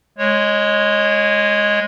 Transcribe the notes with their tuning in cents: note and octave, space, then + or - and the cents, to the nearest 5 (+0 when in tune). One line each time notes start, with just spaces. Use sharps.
G#3 +0 C#5 -20